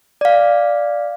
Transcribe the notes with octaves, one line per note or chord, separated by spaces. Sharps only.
D5 F5